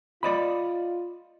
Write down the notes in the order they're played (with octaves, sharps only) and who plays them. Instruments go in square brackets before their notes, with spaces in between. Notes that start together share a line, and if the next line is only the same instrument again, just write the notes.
[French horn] F4 [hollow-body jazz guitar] D5 D#5 B5